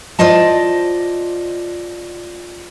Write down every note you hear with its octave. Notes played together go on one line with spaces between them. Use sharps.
F4 C5 D5 D#5 A5